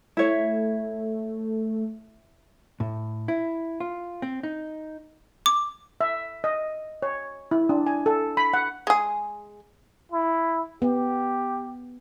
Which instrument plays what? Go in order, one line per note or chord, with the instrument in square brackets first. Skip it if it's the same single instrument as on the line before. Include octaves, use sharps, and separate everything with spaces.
[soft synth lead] A3 [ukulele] E4 C#5 E5
[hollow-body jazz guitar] A2
E4
F4
C4
D#4
[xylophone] D6
[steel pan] E5
D#5
C#5
E4
D4
G#5
A4
B5
F#5
[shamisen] G#3 G#4
[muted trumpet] E4
[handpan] B3 [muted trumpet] G4